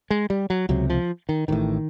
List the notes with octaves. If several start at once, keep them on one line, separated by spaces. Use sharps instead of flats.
G#3
G3
F#3
C#2 C3 F#3
F3
D#3
A1 A2 D#3